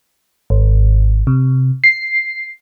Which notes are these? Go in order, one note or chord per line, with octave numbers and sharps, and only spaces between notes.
G#1
C3
C7